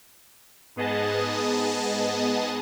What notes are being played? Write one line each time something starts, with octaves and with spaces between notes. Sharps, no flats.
G#2 B3 G#4 D#5 A5